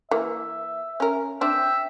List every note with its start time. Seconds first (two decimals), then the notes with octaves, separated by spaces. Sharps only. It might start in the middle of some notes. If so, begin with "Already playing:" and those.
0.11 E3 A#3 E5
1.00 C#4 A#4
1.41 C4 D4 E5 G5